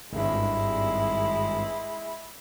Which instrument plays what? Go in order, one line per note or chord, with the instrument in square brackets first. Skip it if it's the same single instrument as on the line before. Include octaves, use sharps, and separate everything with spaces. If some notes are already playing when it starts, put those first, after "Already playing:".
[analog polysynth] G#1 G2 [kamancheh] G#3 E4